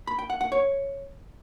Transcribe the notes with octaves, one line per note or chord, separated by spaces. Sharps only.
B5
G5
F#5
F#5
C#5